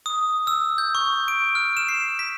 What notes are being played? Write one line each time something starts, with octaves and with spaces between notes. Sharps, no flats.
D#6
E6
G6
C#6
D7
F6
E7
C7
B6